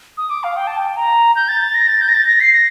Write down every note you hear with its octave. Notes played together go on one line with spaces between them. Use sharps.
D#6
D6
F5
G5
A5
G5
A#5
G6
A6
A6
A#6
A6
G6
A#6
A6
A#6
C7
A#6